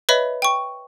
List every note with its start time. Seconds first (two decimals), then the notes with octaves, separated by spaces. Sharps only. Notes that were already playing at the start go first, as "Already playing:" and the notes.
0.09 B4 C#5 D#5 E5 B5
0.42 G5 C#6